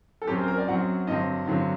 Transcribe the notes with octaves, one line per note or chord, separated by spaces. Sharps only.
A4
F#2 F#3 C4 G4
A#4
C5
A#4
D5
F#2 F#3 C4 F#5
G2 D3 F#3 C4 D#5
G2 D3 F#3 C4